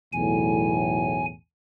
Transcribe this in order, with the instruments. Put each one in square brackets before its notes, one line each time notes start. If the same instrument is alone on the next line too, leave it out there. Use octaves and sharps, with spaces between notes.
[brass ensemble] B1 E2 A2 [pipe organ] G#5